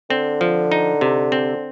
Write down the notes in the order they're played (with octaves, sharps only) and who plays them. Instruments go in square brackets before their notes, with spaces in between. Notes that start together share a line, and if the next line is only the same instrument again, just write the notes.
[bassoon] D3 [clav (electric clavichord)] C4
[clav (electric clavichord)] F3
D#4
C3
C4